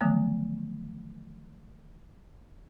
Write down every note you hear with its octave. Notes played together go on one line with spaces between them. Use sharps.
D3 D#3 F3 F#3 A3 B3